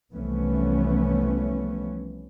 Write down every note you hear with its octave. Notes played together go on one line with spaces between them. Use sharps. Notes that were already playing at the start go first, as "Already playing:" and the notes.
C2 E3 F3 A3 B3 C#4